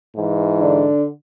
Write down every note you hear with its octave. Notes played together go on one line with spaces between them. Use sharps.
G#2 E3
D3 D4